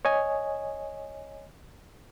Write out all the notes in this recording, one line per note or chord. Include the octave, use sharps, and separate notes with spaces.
C#5 D#5 G#5